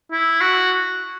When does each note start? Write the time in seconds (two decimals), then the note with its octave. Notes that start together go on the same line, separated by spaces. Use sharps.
0.12 E4
0.41 F#4